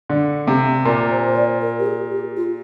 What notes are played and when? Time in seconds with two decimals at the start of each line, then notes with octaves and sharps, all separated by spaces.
0.10 D3
0.47 C3
0.85 A#2 A#4
1.11 C5
1.26 C5
1.36 D5
1.61 A#4
1.79 G4
1.86 G#4
2.12 G4
2.36 F4